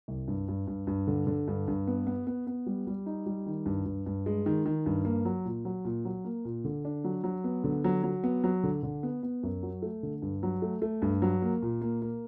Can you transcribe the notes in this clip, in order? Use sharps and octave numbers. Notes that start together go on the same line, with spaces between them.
C2
G2
G2
G2
G2
D3
D3
G2
G2
B3
B3
B3
B3
G3
G3
D#4
G3
D#3
G2
G2
G2
G#3
D#3
D#3
G2
A#3
F#3
A#2
F#3
A#2
F#3
A#3
A#2
D3
D4
F#3
F#3
B3
D3
F#3
F#3
B3
F#3
D3
D3
B3
B3
F#2
F#3
A3
D3
G2
F#3
A3
A3
G2
F#3
A#3
A#2
A#3
A#3